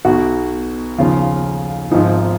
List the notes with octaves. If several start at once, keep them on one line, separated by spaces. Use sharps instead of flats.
B1 B2 F#4
D#2 C#3 F3 F4
G#1 G#2 F3 D#4